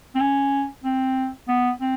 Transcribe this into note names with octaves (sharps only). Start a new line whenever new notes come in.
C4
C#4
C4
B3
C4